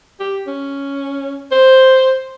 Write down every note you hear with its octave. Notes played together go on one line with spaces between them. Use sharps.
G4
C#4
C5